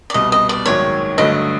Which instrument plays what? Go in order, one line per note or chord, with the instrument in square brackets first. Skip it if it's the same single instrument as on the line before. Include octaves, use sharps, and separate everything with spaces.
[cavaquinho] D5
[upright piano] C2 B2 G3 [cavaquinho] D#5
[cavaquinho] D#5
D5
[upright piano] A#1 G#2 D#3 F#3 [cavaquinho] C#5
[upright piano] G2 D3 F#3 A3 [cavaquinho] D#5